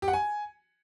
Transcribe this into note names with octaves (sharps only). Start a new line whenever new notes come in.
G4
F#5
G#5